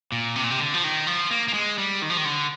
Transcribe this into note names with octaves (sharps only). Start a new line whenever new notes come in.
A#2
C3
A#2
C3
D3
F3
D#3
F3
A#3
A#3
G#3
G3
D#3
F3
D#3
D3